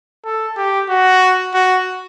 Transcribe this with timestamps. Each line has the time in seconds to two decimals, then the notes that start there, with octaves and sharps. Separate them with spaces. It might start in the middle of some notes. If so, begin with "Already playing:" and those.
0.25 A4
0.57 G4
0.89 F#4
1.54 F#4